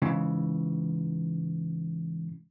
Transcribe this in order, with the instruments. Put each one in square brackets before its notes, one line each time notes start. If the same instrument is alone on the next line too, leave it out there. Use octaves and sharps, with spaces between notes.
[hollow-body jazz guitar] G#2 C#3 E3